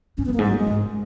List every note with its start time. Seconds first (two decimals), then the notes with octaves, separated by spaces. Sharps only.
0.17 F#2 C#4
0.25 B3
0.29 F#2 A#3
0.39 G#2
0.42 G#3
0.50 F#3
0.57 G#3
0.66 G#2